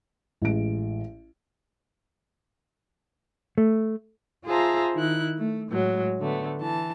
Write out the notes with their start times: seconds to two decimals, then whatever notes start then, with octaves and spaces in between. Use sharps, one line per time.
0.42 A1 G#3 D7
3.58 A3
4.45 F4 G#4 C5 E5 A5 A#5
4.94 D#3 E4 F#6
5.38 A3
5.70 A2 F#3 G#3
6.20 D3 A3 B3
6.61 E3 A5